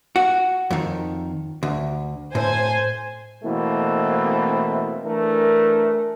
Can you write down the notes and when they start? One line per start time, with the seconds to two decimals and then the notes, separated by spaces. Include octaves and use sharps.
0.16 F#4
0.71 F2 D#3
1.63 D2
2.35 A2 C5 G#5
3.44 B2 E3 A3 A#3 C4 E4
5.04 E3 A3 D4 A#4